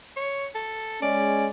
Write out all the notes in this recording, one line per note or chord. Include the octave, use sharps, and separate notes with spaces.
C#5
A4
G#3 C#4 D5